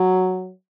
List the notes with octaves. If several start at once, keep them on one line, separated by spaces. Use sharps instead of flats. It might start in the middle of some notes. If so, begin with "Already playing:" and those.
Already playing: F#3